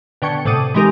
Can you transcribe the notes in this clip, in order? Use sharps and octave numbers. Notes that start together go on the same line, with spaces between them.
B2 D3 G5 C#6 G#6 C#7
A2 C3 A5 D6 D#6 D#7
E3 G#3 C4 D#4 G4 A#4